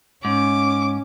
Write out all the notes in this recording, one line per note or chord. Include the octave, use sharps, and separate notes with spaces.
G#2 C#4 D6